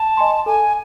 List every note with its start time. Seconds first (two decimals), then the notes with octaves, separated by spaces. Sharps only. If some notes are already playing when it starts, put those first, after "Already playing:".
Already playing: A5
0.17 D#5 G#5 C6
0.46 A4 G#5